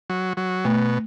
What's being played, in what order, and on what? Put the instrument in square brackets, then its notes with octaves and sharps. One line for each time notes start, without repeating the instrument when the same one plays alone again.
[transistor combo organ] F#3
F#3
[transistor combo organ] B2 [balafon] A3